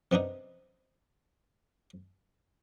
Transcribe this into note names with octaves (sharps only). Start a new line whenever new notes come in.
C3 B3 D4 D#4